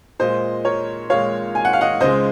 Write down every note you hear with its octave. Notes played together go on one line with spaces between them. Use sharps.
A#2 G#3 C5 D#5
A#4 C#5
A#2 G#3 C#5 F5
G#5
F#5
F5
D#5 F#5
C#2 C#3 G#3 C5 D#5